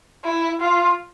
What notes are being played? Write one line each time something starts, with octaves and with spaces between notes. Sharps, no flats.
E4
F4